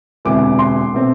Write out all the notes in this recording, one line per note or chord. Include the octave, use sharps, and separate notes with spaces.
E1 D2 C3 E3 D6
C6
B2 A3 C4